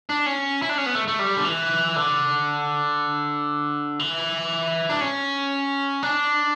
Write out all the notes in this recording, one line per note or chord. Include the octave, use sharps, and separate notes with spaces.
D4
C#4
E4
D4
C#4
B3
A3
A3
G3
D3
E3
D3
E3
D4
C#4
D4